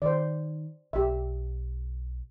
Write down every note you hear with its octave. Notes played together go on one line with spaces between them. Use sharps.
D#3 C5 D5
B1 G4 E5